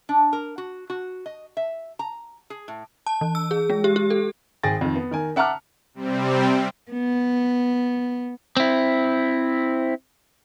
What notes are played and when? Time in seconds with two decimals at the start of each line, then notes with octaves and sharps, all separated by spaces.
0.09 D4
0.33 A#4
0.58 F#4
0.90 F#4
1.26 D#5
1.57 E5
1.99 A#5
2.50 G#4
2.68 A2
3.06 A5
3.21 E3
3.35 E6
3.51 G#4
3.70 G#3
3.84 G4
3.96 G4
4.10 A4
4.63 G#1 G#4 G5 A6 A#6
4.81 F2 D#3
4.95 B3
5.11 D#3 A#4 G#5
5.36 E5 F#5 A5 A#5 D6 F6
5.94 C3 G3 C4
6.91 B3
8.57 C4 E4